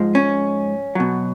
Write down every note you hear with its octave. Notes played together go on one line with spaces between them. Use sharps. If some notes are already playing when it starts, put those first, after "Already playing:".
Already playing: G#2 F3 G#3
C#4
B2 F#3